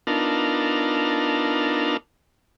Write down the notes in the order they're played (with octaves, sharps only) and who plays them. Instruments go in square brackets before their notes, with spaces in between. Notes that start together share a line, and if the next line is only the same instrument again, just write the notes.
[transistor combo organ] B3 D4 D#4 F4 A#4 A5